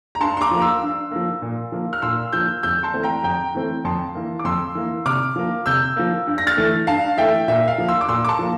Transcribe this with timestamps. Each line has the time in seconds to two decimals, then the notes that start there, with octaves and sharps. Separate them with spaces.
0.15 A#5
0.20 G2 A5 C6
0.37 C6
0.41 A#5 D6
0.51 F3 A#3
0.61 C6 E6
0.82 G2
1.11 F3 A#3
1.42 A#2
1.72 F3 A#3
1.93 F6
2.02 A#2 C6 E6
2.33 F3 A#3 E6 G6
2.63 F2 E6 G6
2.83 A5 C6
2.94 E3 A3 C4
3.03 G5 A#5
3.23 F2 G5 A#5
3.55 E3 A3 C4
3.85 F2 A5 C6
4.15 E3 A#3
4.39 D6
4.44 F2 C6 E6
4.75 E3 A#3
5.06 C3 D6 F6
5.36 F3 A#3
5.66 C3 E6 G6
5.96 F3 A#3
6.27 G2
6.38 A#6
6.47 F6 A6
6.57 E3 A3
6.87 G2 F5 A5
7.18 E3 A3 E5 G5
7.48 A#2 E5
7.68 F5
7.78 F3 A#3
7.88 C6 E6
8.01 D6
8.08 A#2 C6 E6
8.25 D6
8.29 A5 C6
8.39 F3 A#3